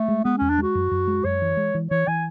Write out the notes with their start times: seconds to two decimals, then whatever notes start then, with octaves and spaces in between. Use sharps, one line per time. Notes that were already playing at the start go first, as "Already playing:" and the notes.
Already playing: A3
0.08 G#3
0.24 G#3 B3
0.38 E2 C#4
0.50 D4
0.58 G#3 F#4
0.75 F#2
0.91 F#2
1.08 G#3
1.24 F#2 C#5
1.42 E3
1.57 G#3
1.75 E3
1.91 E3 C#5
2.07 E3 G#5